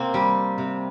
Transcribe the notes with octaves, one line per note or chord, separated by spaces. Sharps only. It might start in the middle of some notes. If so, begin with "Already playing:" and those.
Already playing: C3 A#3 C4
G3
C3